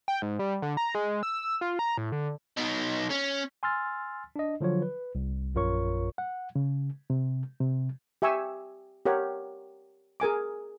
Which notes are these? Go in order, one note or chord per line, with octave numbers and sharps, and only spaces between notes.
G5
G#2
G3
D3
A#5
G#3
E6
F4
A#5
A2
D3
B2 D#4
C#4
G#5 C6 E6 F6 A6
D4 D#5
D3 F3 F#3 F4 C#5
B4
C2
A#1 F#2 F4 A#4 C#5 C#6
F#5
C#3
C3
C3
G4 E5 G#5 C#6 E6
G4 A#4 C#5 F#5
G#4 A#4 G#5 D6